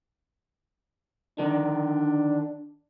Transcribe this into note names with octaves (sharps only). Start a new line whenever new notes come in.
D3 D#3 D4